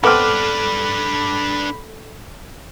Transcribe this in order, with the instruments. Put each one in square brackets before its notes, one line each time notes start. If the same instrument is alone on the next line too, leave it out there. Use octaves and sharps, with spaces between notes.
[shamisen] B3 C4 [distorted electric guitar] D4 B4 [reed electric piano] A4 D6 F6 [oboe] B5